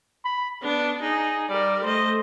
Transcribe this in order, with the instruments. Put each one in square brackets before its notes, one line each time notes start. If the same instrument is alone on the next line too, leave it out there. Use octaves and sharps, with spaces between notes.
[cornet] B5
[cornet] B3 [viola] D4
[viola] D#4 [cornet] G#4
[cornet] G3 [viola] A#4 D5
[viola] A3 D#5 [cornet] C5